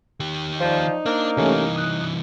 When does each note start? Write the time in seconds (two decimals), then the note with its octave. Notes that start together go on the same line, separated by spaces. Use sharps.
0.20 D#3 G4
0.61 F3 D#4 C5 D5
1.06 A#3 D4
1.37 C2 E3 A3 C#4 G4
1.76 D#6 F#6